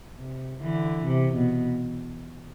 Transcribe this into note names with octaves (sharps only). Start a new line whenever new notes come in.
C3
D3 E3
C3
B2